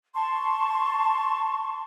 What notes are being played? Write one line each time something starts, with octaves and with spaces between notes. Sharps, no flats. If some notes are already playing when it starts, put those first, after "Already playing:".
A5 C6 C#6